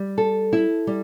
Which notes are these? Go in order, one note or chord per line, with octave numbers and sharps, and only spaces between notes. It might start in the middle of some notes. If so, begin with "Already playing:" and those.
Already playing: G3
A4
E4
G3